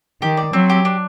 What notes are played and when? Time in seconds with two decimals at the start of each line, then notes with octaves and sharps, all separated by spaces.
0.21 D#3 G4
0.37 D5
0.53 F#3 C4
0.70 G4
0.85 D4